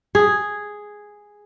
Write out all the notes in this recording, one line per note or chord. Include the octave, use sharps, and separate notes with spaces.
G#4